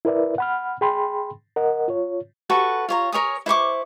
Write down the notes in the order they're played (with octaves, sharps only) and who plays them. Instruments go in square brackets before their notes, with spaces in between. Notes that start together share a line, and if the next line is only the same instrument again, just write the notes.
[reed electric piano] E4 A#4 B4 D5 E5
F#5 B5 F6
G#4 G5 B5 C6
A#4 D#5 F#5
F4 C#5
[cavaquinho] F#4 A4 B4 C#6
F4 C#5 A#5
A#4 C#5 G#5 D#6
E4 C5 C#6 D6